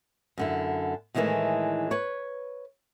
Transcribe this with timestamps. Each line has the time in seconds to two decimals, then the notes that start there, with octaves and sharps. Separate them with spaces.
0.38 F#2 D3 E4
1.15 A2 D#3 E3 F#3 G#3 A3
1.91 B4 C#5